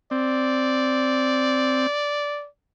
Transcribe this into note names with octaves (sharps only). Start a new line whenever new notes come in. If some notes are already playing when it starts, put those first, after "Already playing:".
C4 D5